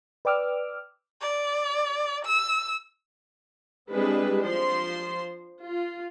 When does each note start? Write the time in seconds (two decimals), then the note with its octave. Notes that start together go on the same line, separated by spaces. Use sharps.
0.25 B4 D5 G5 D6 E6 F6
1.22 D5
2.25 E6
3.92 G3 G#3 C4 D4 E4 B4
4.44 F3 C5 C6
5.63 F4